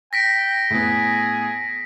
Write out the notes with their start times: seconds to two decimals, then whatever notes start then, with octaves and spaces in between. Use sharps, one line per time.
0.13 G5 A#6 B6 D7
0.71 A2 B3 G#4